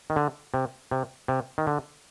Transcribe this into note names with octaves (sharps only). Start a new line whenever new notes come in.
D#3
D3
C3
C3
C3
D#3
D3